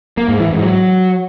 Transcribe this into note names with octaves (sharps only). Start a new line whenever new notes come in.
A#3
G#2
E3
G#2
F#3